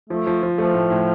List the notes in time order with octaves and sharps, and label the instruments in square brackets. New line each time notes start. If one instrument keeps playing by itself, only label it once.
[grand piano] F3 [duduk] A3
[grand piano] F3
F3
[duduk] F3 [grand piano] A3
[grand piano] A2
A2